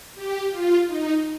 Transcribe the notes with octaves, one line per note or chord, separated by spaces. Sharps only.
G4
F4
D#4